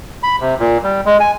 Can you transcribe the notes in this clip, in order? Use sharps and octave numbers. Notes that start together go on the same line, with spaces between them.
B5
C3
A#2
G3
G#3
G#5